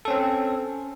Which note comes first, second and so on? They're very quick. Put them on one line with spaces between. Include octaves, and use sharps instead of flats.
A4 C#4 C4